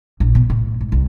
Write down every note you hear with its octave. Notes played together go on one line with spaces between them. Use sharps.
A#1
B2
A2
G#2
C2